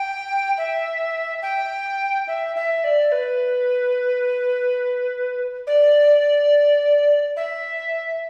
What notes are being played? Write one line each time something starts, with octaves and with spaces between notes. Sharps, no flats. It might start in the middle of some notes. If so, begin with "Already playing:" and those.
Already playing: G5
E5
G5
E5
E5
D5
B4
D5
E5